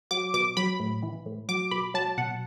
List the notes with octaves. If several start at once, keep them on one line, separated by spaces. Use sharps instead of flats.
F#3 D6
B2 D6
F#3 B5
A2
E3
A2
F#3 D6
B2 B5
F#3 A5
B2 F#5